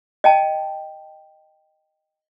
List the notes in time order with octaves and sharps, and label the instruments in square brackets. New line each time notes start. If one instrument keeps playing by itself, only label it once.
[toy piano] D#5 G5 A5